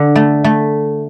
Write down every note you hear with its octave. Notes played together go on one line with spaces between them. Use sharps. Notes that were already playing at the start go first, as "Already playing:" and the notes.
Already playing: D3
A3
A3